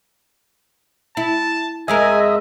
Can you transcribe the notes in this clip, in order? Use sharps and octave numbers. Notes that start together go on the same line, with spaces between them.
E4 A5
F2 G#3 A#4 D#5 E5 G#5